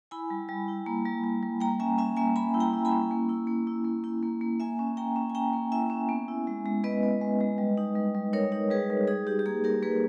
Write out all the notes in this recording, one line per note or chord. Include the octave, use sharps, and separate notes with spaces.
E4 G#5 B5
G3
G3
E4
A#3
G3
G3
G3
A#3 G5 A#5
C#4 E5 G#5
C#4 E5 G#5
A#3 E5 G#5
C#4 G#5 B5
E4
G5 A#5
E4
G#5 B5
C#4
A#3
E4
A#3
E4
A#3
E4
A#3
A#3
A#3 E5 G#5
C#4
A#3 G5 A#5
C#4
G#5
C#4 G5 A#5
A#3
E4 E5 G#5
C#4
B3
E4
G#3
G#3
B3 B4 D#5
B3
G#3
G#3
G3
D#4
G3
G3
D#4 A#4 C#5
D#4
G3 G#4 B4
G3
D#4 G#4
D#4 G4
G4
A#3 G#4
D#4 G4 A#4
A#3 G#4 B4